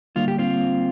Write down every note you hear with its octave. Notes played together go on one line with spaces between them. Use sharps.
D3 G3 A#3 D4 F4
G4
C4 F4